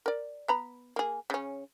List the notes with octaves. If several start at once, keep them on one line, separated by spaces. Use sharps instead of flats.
A#4 D5
B3 A#5 B5
A#3 G#4
C#3 C#4